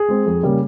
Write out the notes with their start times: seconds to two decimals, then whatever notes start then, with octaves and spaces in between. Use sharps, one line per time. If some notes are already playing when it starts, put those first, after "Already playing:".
Already playing: G#4
0.09 G#3 C4
0.26 F2
0.43 C#3 G3 A#3